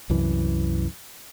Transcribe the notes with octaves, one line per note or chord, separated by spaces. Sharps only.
C2 F#2 E3